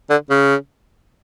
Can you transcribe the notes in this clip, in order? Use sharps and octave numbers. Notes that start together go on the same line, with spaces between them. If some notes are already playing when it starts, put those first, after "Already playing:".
D3
C#3